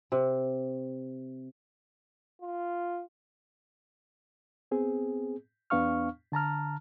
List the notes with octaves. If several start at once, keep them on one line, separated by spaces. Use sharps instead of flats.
C3
F4
B3 C4 G#4
E2 B3 D4 F5 C#6 F6
D3 A5 A#5 F6